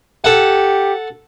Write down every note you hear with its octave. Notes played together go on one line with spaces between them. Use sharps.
G4 A4 F#5